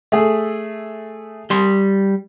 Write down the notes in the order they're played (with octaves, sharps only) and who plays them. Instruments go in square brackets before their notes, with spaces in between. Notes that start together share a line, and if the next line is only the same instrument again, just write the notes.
[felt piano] A3 G#4
[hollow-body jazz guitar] G3 C6